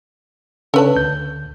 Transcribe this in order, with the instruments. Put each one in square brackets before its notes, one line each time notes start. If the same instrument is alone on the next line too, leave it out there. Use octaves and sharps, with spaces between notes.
[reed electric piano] C#3 C#4 D4 [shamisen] A4 B4 A5
[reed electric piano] D2 G6